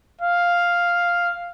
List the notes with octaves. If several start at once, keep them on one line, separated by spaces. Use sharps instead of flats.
F5